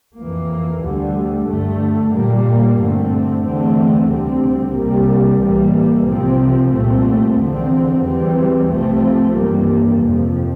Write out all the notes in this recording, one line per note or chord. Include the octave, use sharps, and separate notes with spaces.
F2 E3 A#3
D2 D3 G3
G2 D3 A3
A#2 G3 A#3
G2 D3 A3 C4
E2 D3 A3 C4
D2 C3 G3 C4
C2 C3 G3 A#3
A2 E3 G3 A#3
C2 C3 F3 C4
C2 A#2 A3 C4
E2 D3 F3 C4
E2 E3 G3 C4
C2 C3 F3 A3 C4
G2 E3 G3 A#3
F2 C3 F3